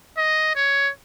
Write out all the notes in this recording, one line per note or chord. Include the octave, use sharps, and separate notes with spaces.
D#5
C#5